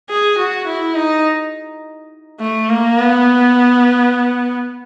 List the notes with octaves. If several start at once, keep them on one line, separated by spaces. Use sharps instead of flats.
G#4
F#4
E4
D#4
A3
A#3
B3